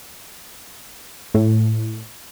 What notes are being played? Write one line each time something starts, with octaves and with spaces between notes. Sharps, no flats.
A2